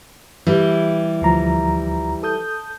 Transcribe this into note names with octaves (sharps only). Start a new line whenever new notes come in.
E3 G3
D2 F3 A#5
A4 D#6 G6